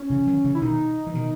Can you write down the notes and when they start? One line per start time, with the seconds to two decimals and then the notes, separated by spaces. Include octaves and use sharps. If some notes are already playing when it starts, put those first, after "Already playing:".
Already playing: C#4
0.10 C#3 E3
0.27 D#3 F#3
0.44 C#3 E3
0.55 E4
0.62 B2 D#3 D#4
1.07 E3
1.14 B2 D#3